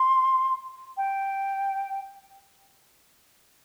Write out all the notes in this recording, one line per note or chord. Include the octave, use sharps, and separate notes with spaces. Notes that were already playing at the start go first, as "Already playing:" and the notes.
Already playing: C6
G5